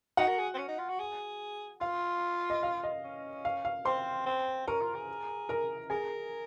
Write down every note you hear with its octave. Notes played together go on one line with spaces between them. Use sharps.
D#4 F#4 F#5
A#4
G#4
C4
C#4
D#4
F4
F#4
G#4
F4 F5
D#5
F5
D#5
C#4
F5
F5
C4 C5 C6
C4
C#4 A#4 A#5
F4
G#4
A#4 A#5
G#4 A#4 G#5